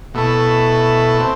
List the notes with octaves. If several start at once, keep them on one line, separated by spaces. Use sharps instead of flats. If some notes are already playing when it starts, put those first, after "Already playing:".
B2 A3 E4 A4
C4